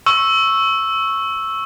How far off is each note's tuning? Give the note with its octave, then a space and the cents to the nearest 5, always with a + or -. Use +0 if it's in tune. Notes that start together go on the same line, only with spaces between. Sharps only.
C#6 -10 E6 +0